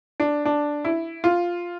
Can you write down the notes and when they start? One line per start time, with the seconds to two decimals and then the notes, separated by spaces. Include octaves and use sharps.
0.20 D4
0.45 D4
0.85 E4
1.24 F4